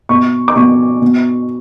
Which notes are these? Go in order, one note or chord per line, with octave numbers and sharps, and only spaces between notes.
B2 C#6
D6
B2 C#6
B2